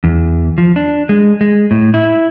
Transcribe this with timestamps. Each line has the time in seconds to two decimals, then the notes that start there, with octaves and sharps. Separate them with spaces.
0.04 E2
0.58 F3
0.76 D4
1.09 G#3
1.41 G#3
1.71 A2
1.94 E4